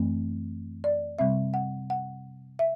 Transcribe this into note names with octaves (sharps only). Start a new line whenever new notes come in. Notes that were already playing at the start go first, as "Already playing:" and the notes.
Already playing: F#2 E3 A3 C4
D5
C3 G3 C4 E5
F#5
F#5
E5